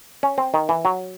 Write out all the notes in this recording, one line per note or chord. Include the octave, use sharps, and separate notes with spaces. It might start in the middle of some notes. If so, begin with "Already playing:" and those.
C#4
C4
D#3
E3
F#3